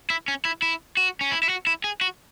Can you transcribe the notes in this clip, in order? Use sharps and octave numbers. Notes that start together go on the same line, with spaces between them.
E4
C#4
E4
E4
F#4
C#4
E4
E4
F#4
E4
G#4
F#4